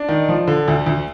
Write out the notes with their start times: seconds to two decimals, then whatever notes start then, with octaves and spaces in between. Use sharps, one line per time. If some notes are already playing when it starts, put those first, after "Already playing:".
Already playing: D4
0.09 D#3
0.29 F3
0.48 D3
0.68 D2
0.86 D2